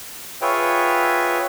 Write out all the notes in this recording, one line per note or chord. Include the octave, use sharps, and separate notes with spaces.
F4 G#4 B4 C#5 E5 G5